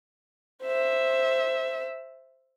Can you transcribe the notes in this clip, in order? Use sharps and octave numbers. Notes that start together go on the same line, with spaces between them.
C5 E5